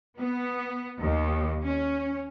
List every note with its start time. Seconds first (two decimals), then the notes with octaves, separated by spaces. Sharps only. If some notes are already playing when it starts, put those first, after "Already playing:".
0.18 B3
1.01 D#2
1.64 C#4